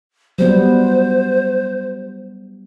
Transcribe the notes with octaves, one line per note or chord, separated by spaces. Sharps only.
F#3 G3 B3 C5